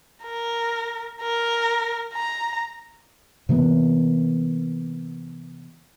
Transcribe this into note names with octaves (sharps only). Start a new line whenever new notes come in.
A#4
A#4
A#5
C3 E3 A#3 B3